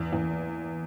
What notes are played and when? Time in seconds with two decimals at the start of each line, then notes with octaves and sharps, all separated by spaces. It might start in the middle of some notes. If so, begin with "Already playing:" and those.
Already playing: E2
0.13 E2